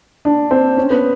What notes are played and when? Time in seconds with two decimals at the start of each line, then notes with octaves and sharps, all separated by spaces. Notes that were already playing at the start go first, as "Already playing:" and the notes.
0.25 D4
0.51 C4
0.77 C#4
0.90 B3